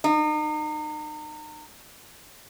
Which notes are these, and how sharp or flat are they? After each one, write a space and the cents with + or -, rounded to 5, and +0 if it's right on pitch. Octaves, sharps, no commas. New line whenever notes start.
D#4 -35